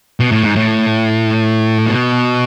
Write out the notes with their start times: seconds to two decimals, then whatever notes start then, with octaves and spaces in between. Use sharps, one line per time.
0.20 B2
0.32 A2
0.43 G#2
0.56 A2
1.86 B2